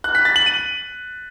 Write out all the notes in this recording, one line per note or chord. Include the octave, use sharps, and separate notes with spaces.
F#6
B6
A6
F#7
D#7